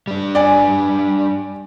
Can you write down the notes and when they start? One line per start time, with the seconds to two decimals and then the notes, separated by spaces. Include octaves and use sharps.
0.07 G3 D4
0.35 D5 G#5